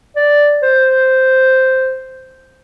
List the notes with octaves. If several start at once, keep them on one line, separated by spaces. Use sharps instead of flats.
D5
C5